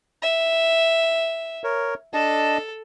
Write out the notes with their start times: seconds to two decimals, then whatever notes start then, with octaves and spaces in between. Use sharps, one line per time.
0.22 E5
1.64 A#4 C#5
2.14 D4 A4 D#5 A5